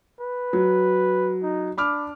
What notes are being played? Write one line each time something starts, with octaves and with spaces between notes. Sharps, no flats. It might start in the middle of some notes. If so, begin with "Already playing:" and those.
B4
F#3
D#4
D4 B5 D6 F6